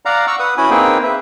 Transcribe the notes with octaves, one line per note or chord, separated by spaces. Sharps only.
D5 F5 F#5 A#5
F#5 C#6 E6
B4 F#5 D#6
C#4 E4 F#4 G#5 B5 D#6
A#3 C4 D#4 G#4 B4 G5
B4 E5